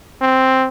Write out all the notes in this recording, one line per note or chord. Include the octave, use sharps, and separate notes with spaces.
C4